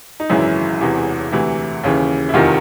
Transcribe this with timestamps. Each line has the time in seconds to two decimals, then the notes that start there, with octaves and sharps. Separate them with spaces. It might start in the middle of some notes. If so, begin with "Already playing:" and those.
0.20 D#4
0.29 G#1 F#2 C#3 E3 E4
0.81 E1 E2 C3 E3
1.32 D2 C3 E3 E4
1.84 D#2 C#3 E3
2.29 E4
2.34 F1 E2 C3 D#3 F4